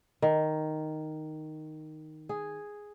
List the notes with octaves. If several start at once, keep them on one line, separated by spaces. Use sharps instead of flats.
D#3
G#4